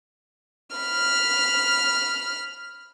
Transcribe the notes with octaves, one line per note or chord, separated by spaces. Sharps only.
B5 F6